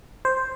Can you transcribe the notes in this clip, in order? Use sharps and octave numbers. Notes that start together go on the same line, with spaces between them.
C5